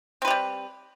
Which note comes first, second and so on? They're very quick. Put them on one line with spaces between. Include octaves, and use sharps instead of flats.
C4 B4 G4 G3